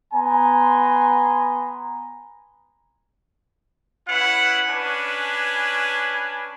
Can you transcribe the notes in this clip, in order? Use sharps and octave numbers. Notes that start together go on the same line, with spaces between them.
B3 G#5 A#5 C6
C#4 E4 B4 F#5
C#4 D4 B4 G#5